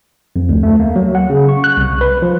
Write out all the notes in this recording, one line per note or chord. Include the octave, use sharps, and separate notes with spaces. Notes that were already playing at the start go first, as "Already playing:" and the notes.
F2
D2
A3
A#3
F#3
F#5
C#3
C#6
F#6
C2
B4
F3